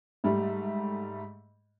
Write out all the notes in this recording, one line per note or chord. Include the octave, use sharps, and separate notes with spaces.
G#2 G3 A3